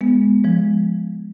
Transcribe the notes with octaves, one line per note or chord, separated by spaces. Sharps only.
G#3 B3
F3 G#3